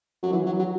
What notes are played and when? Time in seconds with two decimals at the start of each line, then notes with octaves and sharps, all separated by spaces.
0.23 F#3
0.32 E3
0.46 F#3
0.59 F#3